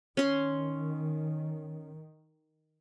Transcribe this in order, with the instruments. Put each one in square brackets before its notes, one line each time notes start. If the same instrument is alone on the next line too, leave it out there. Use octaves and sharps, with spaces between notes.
[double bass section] D#3 [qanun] C#4 C6